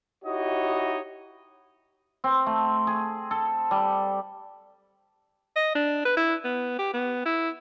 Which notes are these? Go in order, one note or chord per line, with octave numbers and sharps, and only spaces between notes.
D#4 E4 F#4 G4 C#5 D#5
C4
A3
G#4
A4
G3
D#5
D4
B4
E4
B3
G4
B3
E4